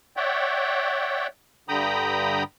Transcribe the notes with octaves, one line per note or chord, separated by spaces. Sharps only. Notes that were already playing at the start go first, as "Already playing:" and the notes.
C#5 D5 E5 F#5 G5
G2 D3 G5 A#5 B5 D#6